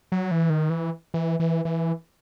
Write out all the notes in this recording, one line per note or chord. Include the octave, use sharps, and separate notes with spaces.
F#3
E3
D#3
E3
E3
E3
E3